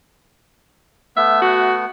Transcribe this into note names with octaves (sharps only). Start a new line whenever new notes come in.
A3 B3 E5
F#4